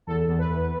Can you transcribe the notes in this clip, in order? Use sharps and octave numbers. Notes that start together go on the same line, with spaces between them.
E2 A4
E2
B4
E2